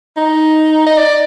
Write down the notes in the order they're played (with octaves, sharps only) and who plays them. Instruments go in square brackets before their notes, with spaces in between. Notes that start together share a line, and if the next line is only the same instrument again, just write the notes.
[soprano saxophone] D#4
D#5
D5